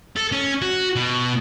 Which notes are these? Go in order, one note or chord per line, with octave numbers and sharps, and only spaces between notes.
A4
C#4
F#4
B2